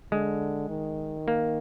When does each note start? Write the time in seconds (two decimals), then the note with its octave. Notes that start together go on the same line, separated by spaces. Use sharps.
0.12 D3 G#3
0.69 D#3
1.28 A#3